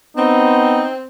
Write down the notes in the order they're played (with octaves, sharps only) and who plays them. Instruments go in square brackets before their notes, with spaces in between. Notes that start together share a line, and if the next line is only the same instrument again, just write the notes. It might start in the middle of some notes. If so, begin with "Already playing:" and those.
[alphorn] B3 [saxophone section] C4 [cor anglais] D#4